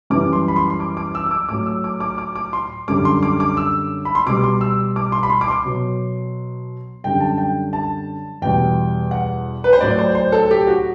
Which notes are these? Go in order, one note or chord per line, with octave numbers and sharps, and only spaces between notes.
F#2 E3 G3 D6
C6
B5
C6
C6
D6
D6
E6
E6
D6
A2 F#3 D6
E6
D6
D6
D6
D6
C6
F#2 D3 G3 D6
C6
D6
D6
E6
B5
C6
B2 G3 D6
C6
E6
D6
C6
B5
C6
D6
C6
B2 F#3
F#2 D3 G3 G5
A5
G5
A5
E2 B2 G3 G5
F#5
B4
C5
A2 F#3 D5
C5
C5
A4
G4
F#4